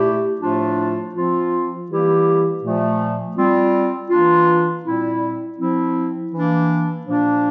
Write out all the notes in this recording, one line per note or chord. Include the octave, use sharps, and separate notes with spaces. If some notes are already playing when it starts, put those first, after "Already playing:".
Already playing: A#2 A3 E4 G4
A2 F3 A3 D4 F4
F3 C4 F4
E3 G3 A#3 E4 G4
A#2 F3 A3
G3 C4 F4
E3 A#3 D4 F4
A#2 G3 C4 E4
F3 C4 E4
E3 A#3 D4
A#2 F3 A#3 D4